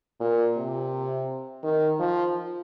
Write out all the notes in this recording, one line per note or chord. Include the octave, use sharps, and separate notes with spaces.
A#2
C3
D#3
F3